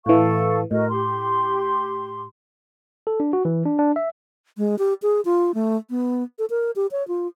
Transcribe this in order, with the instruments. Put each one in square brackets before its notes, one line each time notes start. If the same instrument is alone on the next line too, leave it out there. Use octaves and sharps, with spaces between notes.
[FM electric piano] A2 E3 [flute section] A4 F5 C#6
[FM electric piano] A2 [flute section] F#4 A#4 D#5
[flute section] G4 C6
[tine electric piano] A4
D4
F#4
E3
D4
D4
E5
[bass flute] G#3
G4
G#4
F4
A3
B3
A4
A#4
G4
C#5
F4